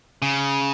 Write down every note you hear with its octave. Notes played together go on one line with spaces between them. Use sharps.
C#3